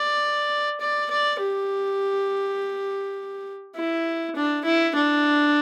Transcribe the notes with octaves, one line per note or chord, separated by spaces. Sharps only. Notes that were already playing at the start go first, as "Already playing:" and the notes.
Already playing: D5
D5
D5
G4
E4
D4
E4
D4